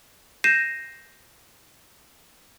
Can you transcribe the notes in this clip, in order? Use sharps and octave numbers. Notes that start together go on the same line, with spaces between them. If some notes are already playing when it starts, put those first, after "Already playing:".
G6 A#6 C7 D#7 E7